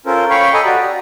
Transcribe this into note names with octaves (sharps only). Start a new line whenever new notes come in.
C#4 F4 A4 A#4 C5
C#5 F5 G5 B5 C#6
A4 D#5 G#5 A#5 B5
F#4 G4 D5
A#5